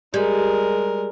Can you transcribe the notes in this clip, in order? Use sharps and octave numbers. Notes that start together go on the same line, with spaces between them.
G3 G#3 A#4